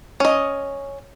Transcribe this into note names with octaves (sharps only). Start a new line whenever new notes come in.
C#4 D#5